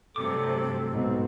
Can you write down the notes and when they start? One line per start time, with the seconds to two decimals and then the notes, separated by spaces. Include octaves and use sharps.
0.16 G2 C3 F#3 A3 A4 D6
0.93 G#2 B2 C4